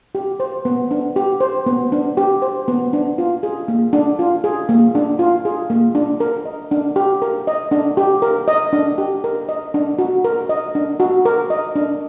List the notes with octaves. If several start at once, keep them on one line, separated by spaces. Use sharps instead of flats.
G4
C5
B3
D4
G4
C5
B3
D4
G4
C5
B3
D4
F4
G#4
A#3
D4
F4
G#4
A#3
D4
F4
G#4
A#3
D4
A#4
D#5
D4
G4
A#4
D#5
D4
G4
A#4
D#5
D4
G4
A#4
D#5
D4
F#4
A#4
D#5
D4
F#4
A#4
D#5
D4